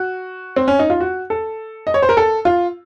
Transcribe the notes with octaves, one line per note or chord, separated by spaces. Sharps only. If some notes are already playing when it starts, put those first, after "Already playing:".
Already playing: F#4
C4
C#4
D#4
F4
F#4
A4
D#5
C#5
C5
A#4
A4
F4